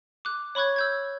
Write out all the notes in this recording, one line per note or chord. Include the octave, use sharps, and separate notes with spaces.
D6 F#6
C#5 B5 C#6 F#6 G#6
E6 G6 G#6